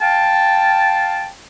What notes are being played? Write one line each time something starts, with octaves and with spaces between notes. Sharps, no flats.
F5 G5 A5